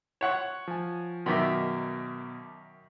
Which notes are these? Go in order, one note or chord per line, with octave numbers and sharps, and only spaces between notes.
C#5 F#5 C#6
F3 G#5
F#2 B2 D#3 E5 A#5 D6